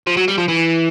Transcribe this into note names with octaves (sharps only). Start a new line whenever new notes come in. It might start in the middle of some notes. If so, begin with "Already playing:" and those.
F3
F#3
G3
F3
E3